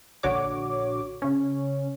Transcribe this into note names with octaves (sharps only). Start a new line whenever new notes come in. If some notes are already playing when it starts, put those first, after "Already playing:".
A#1 D3 F#4 C#5 D6
C#3 C#4